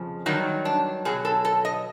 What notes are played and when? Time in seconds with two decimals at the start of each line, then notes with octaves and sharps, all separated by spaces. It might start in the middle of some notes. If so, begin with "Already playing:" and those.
Already playing: F2 C#3 F3
0.26 G2 D#3 F#3 D#4
0.65 D4
1.05 B2 F#3 G#4
1.25 A4
1.45 A4
1.65 D#5